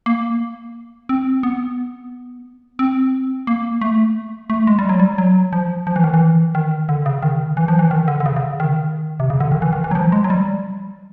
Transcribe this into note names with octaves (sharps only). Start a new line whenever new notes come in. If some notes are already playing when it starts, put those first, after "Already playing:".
A#3
C4
B3
C4
A#3
A3
A3
G#3
G3
F#3
G3
F#3
F3
F3
E3
D#3
E3
D#3
D3
C#3
D#3
E3
F3
E3
D#3
D3
D3
C#3
C#3
D#3
C3
C#3
D3
D#3
E3
D#3
E3
F#3
F3
G#3
F#3
G3